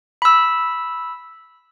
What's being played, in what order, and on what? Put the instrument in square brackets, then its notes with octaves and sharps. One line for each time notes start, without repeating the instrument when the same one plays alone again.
[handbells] B5 E6